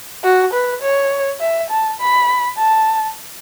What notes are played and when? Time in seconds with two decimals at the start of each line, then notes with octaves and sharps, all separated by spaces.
0.24 F#4
0.53 B4
0.82 C#5
1.41 E5
1.70 A5
2.00 B5
2.58 A5